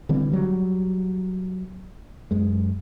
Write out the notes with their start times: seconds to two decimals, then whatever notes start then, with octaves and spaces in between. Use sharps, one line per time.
0.09 D3 E3 G3 C4
0.32 F#3 G3
2.31 F#2 G#3